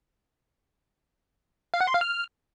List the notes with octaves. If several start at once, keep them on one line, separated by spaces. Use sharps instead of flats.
F5
F#5
C6
F5
F6